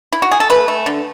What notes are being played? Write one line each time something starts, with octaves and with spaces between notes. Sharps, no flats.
E4
F#4
G#4
A4
A3 B4
A3
D3